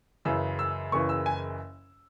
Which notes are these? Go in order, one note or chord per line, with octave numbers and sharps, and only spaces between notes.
F#1 F#2 C#3 E3 E6
E6
F#1 F#2 C#3 E3 C#6
E6
G#5